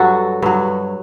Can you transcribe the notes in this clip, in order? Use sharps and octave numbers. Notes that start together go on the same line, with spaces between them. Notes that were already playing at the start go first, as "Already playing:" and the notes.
Already playing: G2 F#3 F#4 A4
G2 F#3